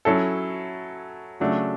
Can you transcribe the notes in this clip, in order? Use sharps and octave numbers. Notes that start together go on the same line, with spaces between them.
F#3 C#4 E4 A4
C#3 F#3 A3 D4 F#4